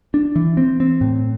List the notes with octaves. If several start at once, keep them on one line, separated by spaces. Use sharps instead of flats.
D4
E3
C4
C4
A2